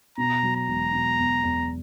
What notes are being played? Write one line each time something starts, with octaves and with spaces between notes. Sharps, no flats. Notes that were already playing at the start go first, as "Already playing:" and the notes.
B2 A#5
F#3
A#5
E1
B2
E2
E2